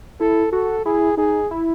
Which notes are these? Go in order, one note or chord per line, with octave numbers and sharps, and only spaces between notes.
E4 A4
F#4 A4
E4 G#4
D#4 G#4
E4